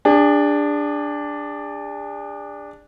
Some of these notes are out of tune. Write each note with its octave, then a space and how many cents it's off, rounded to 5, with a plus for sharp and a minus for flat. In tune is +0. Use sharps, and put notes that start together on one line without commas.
D4 +0 G#4 -40